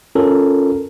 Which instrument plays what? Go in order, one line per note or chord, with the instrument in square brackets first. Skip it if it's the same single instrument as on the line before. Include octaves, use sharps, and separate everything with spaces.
[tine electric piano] C#4 F4 A4 A#4